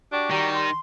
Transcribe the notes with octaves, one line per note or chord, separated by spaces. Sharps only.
D4 F#4 G4
D#3 G3 A#5
C6